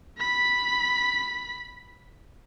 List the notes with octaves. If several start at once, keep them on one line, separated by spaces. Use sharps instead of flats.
B5 B6